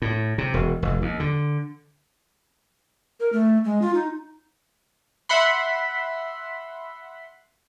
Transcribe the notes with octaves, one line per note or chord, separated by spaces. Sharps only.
A2
C3
E1
F1
D#2
D3
A#4
A3
G#3
F4
D#4
E5 F#5 B5 C6